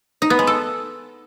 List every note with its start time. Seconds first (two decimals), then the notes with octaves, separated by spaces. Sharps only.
0.22 D#4
0.30 B3
0.39 G#3
0.47 A4